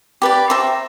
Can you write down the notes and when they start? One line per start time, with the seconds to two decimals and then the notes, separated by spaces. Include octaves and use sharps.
0.22 G4 B4 D5
0.50 C5 E5 G5 A#5